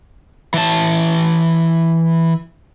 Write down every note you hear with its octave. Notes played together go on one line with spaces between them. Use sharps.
E3 A5